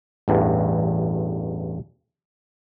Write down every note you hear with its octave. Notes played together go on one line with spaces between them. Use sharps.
A1 E2 G2